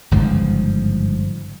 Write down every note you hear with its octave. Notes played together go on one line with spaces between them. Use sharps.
G1 G#2 C#3 F3